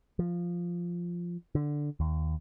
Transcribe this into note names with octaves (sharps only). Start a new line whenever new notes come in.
F3
D3
D#2